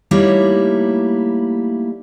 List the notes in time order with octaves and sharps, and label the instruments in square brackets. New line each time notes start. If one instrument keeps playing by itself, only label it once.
[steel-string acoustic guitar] G3 A3 A#3 D#4 E4 C#5